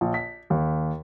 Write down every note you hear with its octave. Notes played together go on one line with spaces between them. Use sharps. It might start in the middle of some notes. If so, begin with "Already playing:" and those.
A#1
B6
D#2